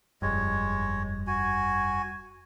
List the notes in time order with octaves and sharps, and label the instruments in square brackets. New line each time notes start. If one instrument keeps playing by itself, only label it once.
[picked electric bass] F1 G2 [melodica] G#3 C#5
[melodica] F#4 G#5